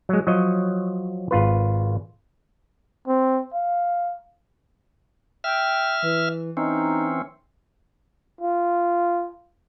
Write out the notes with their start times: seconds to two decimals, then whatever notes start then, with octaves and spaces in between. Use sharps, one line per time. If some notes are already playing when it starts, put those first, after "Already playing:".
0.09 F#3 G#3
0.27 F3 F#3 C#5 D#5
1.31 G#1 F4 B4
3.08 C4
3.53 F5
5.44 E5 G5 F6
6.03 E3
6.57 E3 C4 C#4 D#4
8.41 F4